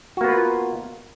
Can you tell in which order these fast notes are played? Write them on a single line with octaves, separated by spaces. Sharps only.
F#4 A#3 B3 B4 F4